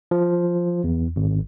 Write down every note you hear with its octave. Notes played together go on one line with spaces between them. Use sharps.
F3
E2
G#1